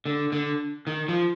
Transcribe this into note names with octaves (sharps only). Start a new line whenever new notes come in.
D3
D3
D#3
F3